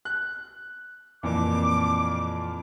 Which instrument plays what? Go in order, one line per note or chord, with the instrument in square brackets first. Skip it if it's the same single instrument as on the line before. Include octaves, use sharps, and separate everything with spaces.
[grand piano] F#6
[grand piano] F2 A#2 E3 [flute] D6